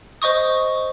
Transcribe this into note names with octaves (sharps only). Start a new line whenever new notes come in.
C5 D#5 C#6 D#6